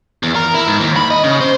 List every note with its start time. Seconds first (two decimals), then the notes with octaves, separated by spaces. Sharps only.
0.23 E2
0.36 A#4
0.54 E4
0.68 G#2
0.80 D#2
0.96 B5
1.11 D#5
1.24 C#3
1.41 C5